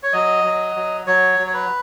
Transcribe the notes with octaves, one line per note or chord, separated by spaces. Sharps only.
C#5
F#3 D#5
F#3
F#3
F#3 C#5
F#3
C#5
B4